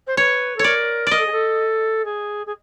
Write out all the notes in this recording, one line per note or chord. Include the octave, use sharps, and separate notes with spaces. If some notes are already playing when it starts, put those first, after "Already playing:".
C5
B4 C#5
A4 C#5
A#4 D5
A#4 D5 D#5
A4
G#4
A4
G#4
G#4